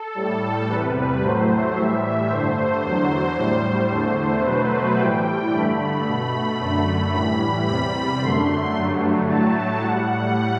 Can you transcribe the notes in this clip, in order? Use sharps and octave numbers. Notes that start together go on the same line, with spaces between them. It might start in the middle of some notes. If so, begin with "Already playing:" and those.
Already playing: A4
A2 G3
E2 C3 G3 B4
A2 F#3 A3 C5
A2 E3 G3 E5
G2 D3 A3 C5
E2 D3 F#3
A2 G3
E2 D3 A3
B2 F#3 A3 B4
A2 E3 G3 G5
G2 D3 A3 B5
B2 A3
F#2 D3 A3 B5
A2 E3 G3 B5
E2 C3 G3 B5
F#2 D3 A3 C6
G2 D3 F#3 A3
A2 F#3 A3 A5
A2 G3 F#5